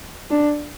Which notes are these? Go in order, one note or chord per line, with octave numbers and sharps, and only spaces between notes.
D4